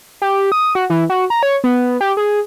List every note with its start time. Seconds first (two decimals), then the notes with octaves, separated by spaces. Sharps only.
0.22 G4
0.52 D#6
0.75 F#4
0.90 E3
1.10 F#4
1.30 A#5
1.43 C#5
1.64 B3
2.01 G4
2.17 G#4